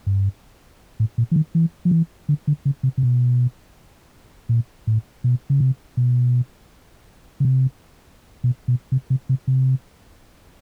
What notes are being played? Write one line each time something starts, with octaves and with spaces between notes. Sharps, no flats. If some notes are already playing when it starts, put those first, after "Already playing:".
G2
A2
A#2
E3
D#3
E3
F3
E3
D3
D3
C#3
C3
C3
B2
A#2
A2
B2
C#3
C3
B2
C#3
C3
B2
B2
C3
C3
C3
C3